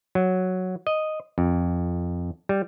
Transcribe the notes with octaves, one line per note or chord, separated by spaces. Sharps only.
F#3
D#5
F2
G3